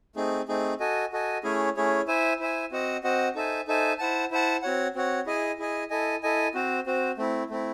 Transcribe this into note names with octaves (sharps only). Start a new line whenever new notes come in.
A3 C4 D#4 G#4
A3 C4 D#4 G#4
F#4 A4 D#5 G#5
F#4 A4 D#5 G#5
A3 C#4 E4 G#4 C#5
A3 C#4 E4 G#4 C#5
E4 C5 E5 G#5
E4 C5 E5 G#5
C4 F#4 C5 D#5 F#5
C4 F#4 C5 D#5 F#5
D#4 A4 C5 E5 G#5
D#4 A4 C5 E5 G#5
E4 C5 F#5 A5
E4 C5 F#5 A5
C4 F#4 C#5 F#5
C4 F#4 C#5 F#5
E4 G#4 D#5 G#5
E4 G#4 D#5 G#5
E4 A4 D#5 G#5
E4 A4 D#5 G#5
C4 F#4 C5
C4 F#4 C5
A3 C4 E4
A3 C4 E4